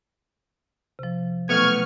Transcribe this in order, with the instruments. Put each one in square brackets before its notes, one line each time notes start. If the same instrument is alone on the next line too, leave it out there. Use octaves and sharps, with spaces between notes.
[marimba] C3 F3
[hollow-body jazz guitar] B1 A3 B3 [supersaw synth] C#6 F6 [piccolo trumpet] G#6